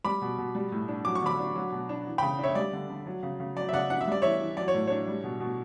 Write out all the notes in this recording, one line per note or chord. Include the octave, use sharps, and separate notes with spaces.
G3 B5 D6
B2
B2
G3
A2
D4
F#3 D6
C#6
D3 B5 D6
D4
F#3
B2
D4
E3
C#3 G5 B5
D4 C#5 E5
G3 D5
D3
D3
F#3
C#3
C#3
F#3 D5
E5
C#3 D5 F#5
D4 F#5
E5
G3 D5
E3 C#5 E5
E3
F#3 D5
C#5
A2
D4 C#5
G3
B2
B2